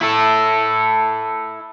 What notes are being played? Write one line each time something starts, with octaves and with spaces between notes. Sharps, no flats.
E4 A4